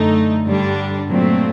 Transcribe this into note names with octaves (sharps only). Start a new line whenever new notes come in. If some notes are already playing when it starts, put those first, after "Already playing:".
Already playing: F#2 D3 A3 D#4
G2 D3 G3 D4
A#2 F#3 A3 C4